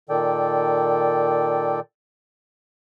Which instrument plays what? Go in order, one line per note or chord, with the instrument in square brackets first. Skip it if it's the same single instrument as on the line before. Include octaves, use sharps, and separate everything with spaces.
[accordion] A#2 D#3 A4 D5 G5